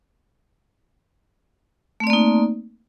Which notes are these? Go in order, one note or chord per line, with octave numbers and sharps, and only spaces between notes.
A3 A#3 C4 D#4 D5